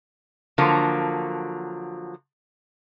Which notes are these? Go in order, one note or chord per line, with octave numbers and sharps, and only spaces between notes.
D3 F3 F#3 A#3